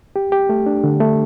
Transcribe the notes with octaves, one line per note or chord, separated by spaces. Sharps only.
G4
G4
A3
D4
D3
A3